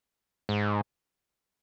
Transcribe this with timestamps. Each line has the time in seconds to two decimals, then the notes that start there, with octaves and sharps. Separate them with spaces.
0.49 G#2